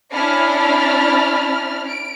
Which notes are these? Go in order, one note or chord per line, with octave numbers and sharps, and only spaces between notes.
C#4 D4 E4 A5 B5 F6
D7